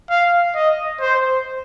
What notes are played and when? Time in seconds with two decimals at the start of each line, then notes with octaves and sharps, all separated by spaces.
0.10 F5
0.55 D#5
1.00 C5